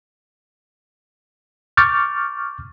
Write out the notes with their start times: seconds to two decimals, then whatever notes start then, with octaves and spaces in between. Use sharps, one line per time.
1.77 C#6 D6 F6 G6 A6